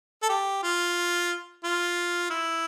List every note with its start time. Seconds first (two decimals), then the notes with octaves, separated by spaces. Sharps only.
0.22 A4
0.29 G4
0.63 F4
1.64 F4
2.30 E4